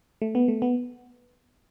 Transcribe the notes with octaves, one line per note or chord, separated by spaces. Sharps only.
A3
B3
A3
B3